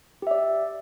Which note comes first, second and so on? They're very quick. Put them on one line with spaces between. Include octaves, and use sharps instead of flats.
G4 E5 D5